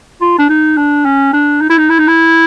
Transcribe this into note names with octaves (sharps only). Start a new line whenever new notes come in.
F4
D4
D#4
D4
C#4
D4
D#4
E4
D#4
E4
D#4
E4